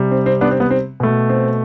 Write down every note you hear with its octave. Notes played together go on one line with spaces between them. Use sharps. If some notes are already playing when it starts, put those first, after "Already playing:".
Already playing: C3 G3
C4
C4
B3 D4
C4
B3
C4
B2 A3
C4